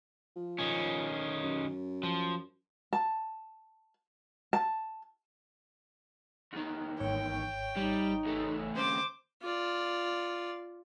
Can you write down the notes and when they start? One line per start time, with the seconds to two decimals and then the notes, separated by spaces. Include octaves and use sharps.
0.36 F3
0.59 D#3 C#4
1.43 F#2
2.03 F3
2.93 A5
4.53 A5
6.53 E2 D#3
7.00 G#1 C#5 G5 C#6
7.76 G3 D#4
8.25 E2 A3
8.75 D#2 C#3 C5 D6
9.42 F4 D5